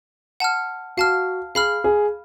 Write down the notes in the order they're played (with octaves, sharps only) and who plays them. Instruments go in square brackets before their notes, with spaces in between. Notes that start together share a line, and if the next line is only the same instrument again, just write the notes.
[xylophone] F#5 A5 F6
[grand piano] F#4 [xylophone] F5 A5 F6
[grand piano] G#4 [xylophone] F5 B5 F6
[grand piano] G#4